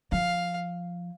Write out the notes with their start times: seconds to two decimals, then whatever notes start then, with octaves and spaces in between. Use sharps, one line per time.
0.12 F3 F5